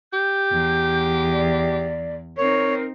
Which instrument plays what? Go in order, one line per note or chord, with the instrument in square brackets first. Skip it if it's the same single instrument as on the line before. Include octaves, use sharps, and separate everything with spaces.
[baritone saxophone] G4 [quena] G6
[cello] E2
[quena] D5
[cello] C4 D#4 [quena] A#4 [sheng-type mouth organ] C#5